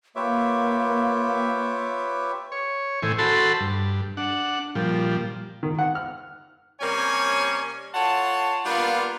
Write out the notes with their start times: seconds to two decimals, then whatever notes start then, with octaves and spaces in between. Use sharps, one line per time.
0.16 A#3 F4 G4 B4 C#5 E5 D6
2.52 C#5
3.02 A2 E3 C5 G#5
3.19 F#4 A4 C5 A5 B5 C6
3.60 G2
4.17 D4 F#5
4.75 A#2 F3 G3
5.63 D#3
5.79 F#5
5.95 F6
6.80 C3 G3 A#3 C#4 C#5 G#5
7.94 F4 A4 C#5 F#5 A5 C6
8.65 G3 A#3 B3 D4 F4